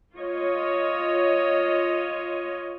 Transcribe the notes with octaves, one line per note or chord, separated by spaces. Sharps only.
F4 C#5 D#5